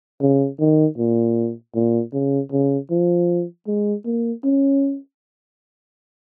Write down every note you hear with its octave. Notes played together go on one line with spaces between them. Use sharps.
C#3
D#3
A#2
A#2
C#3
C#3
F3
G#3
A#3
C#4